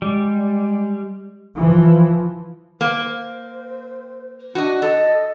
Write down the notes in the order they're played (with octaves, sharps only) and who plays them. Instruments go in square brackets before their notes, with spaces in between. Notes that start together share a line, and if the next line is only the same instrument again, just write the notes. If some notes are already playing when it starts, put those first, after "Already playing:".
[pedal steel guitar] G3 [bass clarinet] G#3
[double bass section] E3 F3
[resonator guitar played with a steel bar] A#3 [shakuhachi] C5
[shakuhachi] D4 [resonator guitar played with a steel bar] F#4 D#5
[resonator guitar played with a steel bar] A4 [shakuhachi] D#5